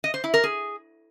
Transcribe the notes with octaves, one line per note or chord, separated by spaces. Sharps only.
D#5
C5
E4
A#4
G#4